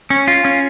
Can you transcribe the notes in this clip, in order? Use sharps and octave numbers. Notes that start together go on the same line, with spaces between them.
C#4
F4
C#4